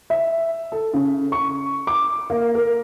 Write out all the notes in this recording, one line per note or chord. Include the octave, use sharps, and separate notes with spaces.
E5
A4
C#3
C#6
D6
A#3
A#4